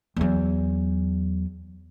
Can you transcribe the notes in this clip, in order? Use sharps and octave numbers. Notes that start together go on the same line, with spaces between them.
E2 F#3